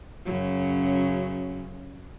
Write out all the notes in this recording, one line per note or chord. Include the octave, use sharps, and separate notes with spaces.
F#2 C#3 F#3